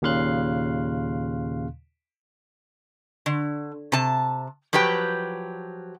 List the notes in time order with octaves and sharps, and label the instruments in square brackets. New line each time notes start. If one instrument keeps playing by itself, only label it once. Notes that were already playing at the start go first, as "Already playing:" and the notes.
[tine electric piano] D#2 A#2 C#3 F5 C6 F#6
[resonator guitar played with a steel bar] D3
C3 A5
F3 F#3 G4 B4 G5